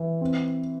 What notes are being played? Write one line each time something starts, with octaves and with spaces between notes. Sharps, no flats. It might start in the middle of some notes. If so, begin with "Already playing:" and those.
Already playing: E3
C4